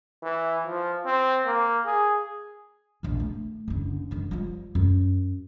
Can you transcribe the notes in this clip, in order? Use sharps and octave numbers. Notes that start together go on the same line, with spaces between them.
E3
F3
C4
A#3
G#4
A#1 E2
A3
F#1 D3
F#2 D3
F3 G3
F#2